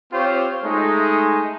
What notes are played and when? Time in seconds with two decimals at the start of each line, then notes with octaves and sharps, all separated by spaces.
0.12 C4 F4 G4 C5 C#5 F5
0.64 G#3 A3 D#4